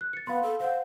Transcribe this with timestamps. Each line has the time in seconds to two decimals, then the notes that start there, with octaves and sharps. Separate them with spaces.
0.01 F#6
0.13 A6 C#7
0.27 B3 F5 B5 C6
0.43 A4
0.60 C5 F5 F#5